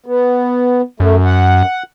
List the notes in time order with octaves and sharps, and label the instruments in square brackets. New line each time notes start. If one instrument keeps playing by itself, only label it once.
[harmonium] B3
[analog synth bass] F#2 [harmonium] A3
[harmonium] F#5